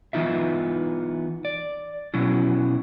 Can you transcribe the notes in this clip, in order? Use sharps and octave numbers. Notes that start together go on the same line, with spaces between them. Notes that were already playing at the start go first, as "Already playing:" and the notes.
E3 B3 D#4 F4 E5
D5
B2 F#3 C#4 E4